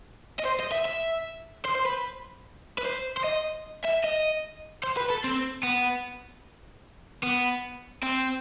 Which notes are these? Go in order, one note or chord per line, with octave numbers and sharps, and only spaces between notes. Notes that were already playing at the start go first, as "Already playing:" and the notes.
D#5
C5
D#5
E5
E5
C5
C5
B4
B4
C5
C5
D#5
E5
D#5
C5
B4
A4
C4
B3
B3
C4